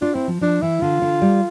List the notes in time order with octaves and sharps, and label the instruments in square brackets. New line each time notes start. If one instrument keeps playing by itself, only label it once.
[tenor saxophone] D4 [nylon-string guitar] F4
[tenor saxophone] C4 [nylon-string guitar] E4
[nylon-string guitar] F3
[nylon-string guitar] F3 [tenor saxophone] D4
[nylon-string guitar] E3 [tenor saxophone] E4
[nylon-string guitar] D3 [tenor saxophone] F4
[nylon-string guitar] D3
G3